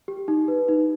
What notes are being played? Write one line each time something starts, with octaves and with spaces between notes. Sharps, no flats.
G4
D#4
B4
D#4